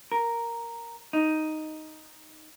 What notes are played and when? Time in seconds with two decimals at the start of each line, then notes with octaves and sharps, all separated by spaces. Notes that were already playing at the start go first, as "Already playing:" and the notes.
0.12 A#4
1.13 D#4